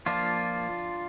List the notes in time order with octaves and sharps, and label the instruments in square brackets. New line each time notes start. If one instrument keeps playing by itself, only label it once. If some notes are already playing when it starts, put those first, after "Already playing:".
[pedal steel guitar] F3 A#3 D4 F4